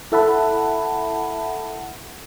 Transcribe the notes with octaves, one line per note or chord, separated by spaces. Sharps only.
E4 A4 E5 F#5 A5 B5